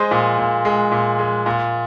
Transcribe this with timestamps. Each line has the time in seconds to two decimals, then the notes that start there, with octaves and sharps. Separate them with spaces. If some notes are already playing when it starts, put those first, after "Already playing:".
Already playing: G#3 C5 D#5
0.11 A#2
0.38 A#2
0.65 G#3
0.92 A#2
1.19 G#3
1.46 A#2